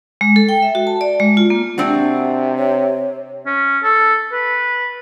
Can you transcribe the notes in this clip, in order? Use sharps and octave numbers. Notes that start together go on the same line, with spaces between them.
G#3
A4
G5
E5
F#4
A5
D5
G#3
F4
A#3
C3 C4 D4 F#4
C#5
C#4
A4
B4